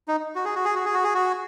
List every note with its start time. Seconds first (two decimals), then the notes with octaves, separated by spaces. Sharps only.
0.08 D#4
0.35 F#4
0.45 G#4
0.55 F#4
0.65 G#4
0.75 F#4
0.85 G#4
0.94 F#4
1.04 G#4
1.15 F#4